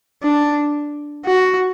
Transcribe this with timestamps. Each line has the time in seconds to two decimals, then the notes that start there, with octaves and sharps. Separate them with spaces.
0.23 D4
1.25 F#4